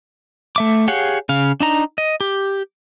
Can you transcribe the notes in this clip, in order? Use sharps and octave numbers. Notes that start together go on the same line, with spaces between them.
A3 E5 D6
G4 G#4 C#5 F5 F#5
C#3 F5
D4 D#4 A#5
D#5
G4